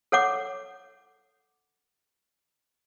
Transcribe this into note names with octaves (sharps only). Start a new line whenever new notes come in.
A4 C#5 F#5 D6